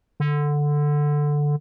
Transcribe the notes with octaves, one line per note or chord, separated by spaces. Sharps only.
D3